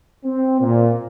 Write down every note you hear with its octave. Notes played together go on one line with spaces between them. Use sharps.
C4
A#2